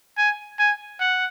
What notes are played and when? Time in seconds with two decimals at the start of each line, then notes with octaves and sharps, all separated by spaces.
0.18 G#5
0.59 G#5
1.00 F#5